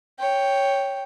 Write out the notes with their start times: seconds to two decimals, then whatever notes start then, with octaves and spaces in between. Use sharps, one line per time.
0.19 C#5 G5